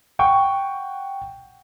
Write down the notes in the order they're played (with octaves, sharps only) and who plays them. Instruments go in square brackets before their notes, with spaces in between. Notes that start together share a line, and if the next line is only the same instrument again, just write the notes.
[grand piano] F#5 G5 C#6